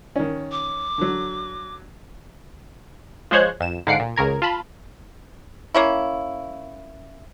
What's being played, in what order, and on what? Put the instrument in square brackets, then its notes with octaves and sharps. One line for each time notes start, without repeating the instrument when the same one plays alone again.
[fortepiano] D#3 C#4
[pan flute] D6
[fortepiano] D3 F#3
[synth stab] F3 G#3 C5 C#5 F#6 G#6
F2 E7
G#2 D3 F5 F#5 C7 D7
A#2
C#2 C#3 A#4 G#6
F4 A5 B5
[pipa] A#3 C#4 E4